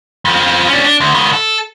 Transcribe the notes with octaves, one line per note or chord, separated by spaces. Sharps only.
F2 F3
C#4 D4
D4
D2
C#2 D#3
A4